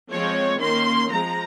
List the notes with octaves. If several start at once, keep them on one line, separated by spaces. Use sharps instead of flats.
F3 G#3 C4 C#5
D#3 A#3 C#4 C6
F3 G#3 C4 A#5